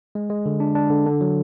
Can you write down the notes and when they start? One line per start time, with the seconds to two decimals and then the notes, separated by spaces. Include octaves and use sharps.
0.15 G#3
0.30 G#3
0.46 D3
0.60 D4
0.75 D4
0.90 D3
1.07 D3
1.21 F#3